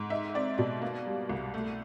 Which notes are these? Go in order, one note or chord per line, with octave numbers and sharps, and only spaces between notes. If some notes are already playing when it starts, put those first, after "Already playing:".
Already playing: G#2
D#4 E5
C4 D5
B2 D5
A#3
G3
C2
A3